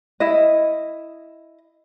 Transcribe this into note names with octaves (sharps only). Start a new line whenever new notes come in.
E4 D#5